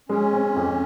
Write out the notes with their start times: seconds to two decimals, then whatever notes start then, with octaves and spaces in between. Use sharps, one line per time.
0.09 G#3 C#4
0.33 C4
0.56 F2